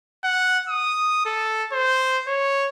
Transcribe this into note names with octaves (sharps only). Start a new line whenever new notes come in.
F#5
D#6
A4
C5
C#5